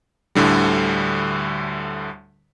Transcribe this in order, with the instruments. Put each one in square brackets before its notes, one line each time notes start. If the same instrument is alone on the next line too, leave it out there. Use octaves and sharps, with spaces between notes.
[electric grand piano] D2 A2 D3 G3